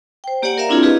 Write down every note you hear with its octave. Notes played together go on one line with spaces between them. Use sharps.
C5 G5
A#3 G4 C#5 D5 F#5 G#5
A#4 D5 E5 F5 A#5
C4 D4 E4 F4 G#4 C#5
E4 G4 G#4 B4 D#5 F5